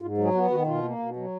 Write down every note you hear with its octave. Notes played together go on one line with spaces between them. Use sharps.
G#2 F4
F#3
G#4
B3 F#4
D#3 F#4
B2 F4
A#3
B2
F#3